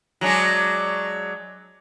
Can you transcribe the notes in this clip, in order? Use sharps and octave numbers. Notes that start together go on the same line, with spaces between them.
F#3 G#3 D4